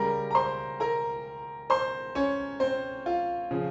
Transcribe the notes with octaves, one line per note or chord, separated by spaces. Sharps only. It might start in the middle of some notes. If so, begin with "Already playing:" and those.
Already playing: C#3 G3 A#4 A#5
A#5
C5 C6
A#4 A#5
C5 C6
C#4 C#5
C4 C5
F4
C#3 F3